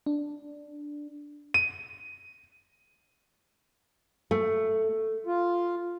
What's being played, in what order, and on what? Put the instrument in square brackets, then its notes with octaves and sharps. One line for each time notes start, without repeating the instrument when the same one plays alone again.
[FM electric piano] D4
[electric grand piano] D#7
[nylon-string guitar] A3
[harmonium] F4